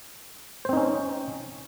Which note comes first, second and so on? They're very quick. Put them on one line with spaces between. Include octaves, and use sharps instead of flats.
C5 C4 D#4 C#4